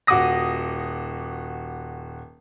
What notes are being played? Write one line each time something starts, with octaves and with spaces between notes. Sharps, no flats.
D#1 F#4 F#5 D6 D#6 A#6